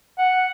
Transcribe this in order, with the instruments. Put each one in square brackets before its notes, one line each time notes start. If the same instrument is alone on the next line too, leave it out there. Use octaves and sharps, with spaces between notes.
[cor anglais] F#5